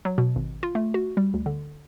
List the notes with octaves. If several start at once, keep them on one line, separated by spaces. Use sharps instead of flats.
F#3
B2
G#1
F4
A3
F#4
G3
D2
D3